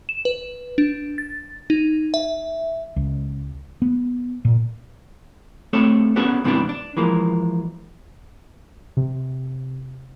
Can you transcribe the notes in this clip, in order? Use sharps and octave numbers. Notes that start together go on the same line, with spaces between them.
E7
B4
D4
A6
D#4
E5
C#2
B3
A#2
A3 C4 A4 C#5
B3 C#4 D4 F#4 G#4 A4
G#2 C3 E3 B3 C#4 D4
D4
E3 F3 G#3 A#3
C3